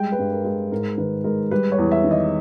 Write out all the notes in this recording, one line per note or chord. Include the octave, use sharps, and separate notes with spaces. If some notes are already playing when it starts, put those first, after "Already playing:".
Already playing: G3 G#3 G5
B4
G2
A#4
G#3
G#2 A#4
D#3 B4
G#3 A#4
G3 B4
C#5
E2
E5
D#3
D#5